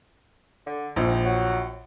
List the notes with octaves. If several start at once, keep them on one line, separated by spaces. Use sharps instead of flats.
D3
A#1 G#2
F#3